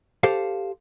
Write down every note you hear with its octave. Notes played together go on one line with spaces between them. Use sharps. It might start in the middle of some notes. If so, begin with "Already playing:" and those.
G4 A4 C5 F5